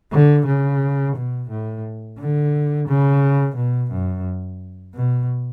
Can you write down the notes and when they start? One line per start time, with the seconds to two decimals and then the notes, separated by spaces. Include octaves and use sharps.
0.12 D3
0.46 C#3
1.16 B2
1.49 A2
2.19 D3
2.88 C#3
3.56 B2
3.91 F#2
4.95 B2